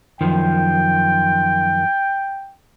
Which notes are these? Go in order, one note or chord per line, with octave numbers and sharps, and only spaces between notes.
F#2 D#3 F3 G5